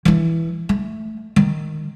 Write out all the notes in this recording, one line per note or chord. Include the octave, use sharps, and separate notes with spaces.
E3 E4
A3
D#3